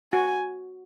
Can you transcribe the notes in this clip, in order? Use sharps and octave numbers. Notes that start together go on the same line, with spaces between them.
F#4 G#5